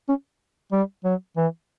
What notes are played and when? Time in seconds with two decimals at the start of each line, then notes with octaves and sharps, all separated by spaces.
0.08 C#4
0.72 G3
1.04 F#3
1.37 E3